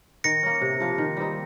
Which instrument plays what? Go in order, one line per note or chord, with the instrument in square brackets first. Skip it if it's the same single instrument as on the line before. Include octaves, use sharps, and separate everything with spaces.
[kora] D#3 [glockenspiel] A#6 C#7
[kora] A#3 C#4
C3
F3 A#3 F4
D#3
G3 C4 D#4